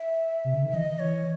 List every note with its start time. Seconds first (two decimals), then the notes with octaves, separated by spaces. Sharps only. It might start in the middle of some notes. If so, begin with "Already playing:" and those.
Already playing: E5
0.45 C3
0.54 C#3
0.64 D#3
0.73 E3 D#5
0.99 E3 C#5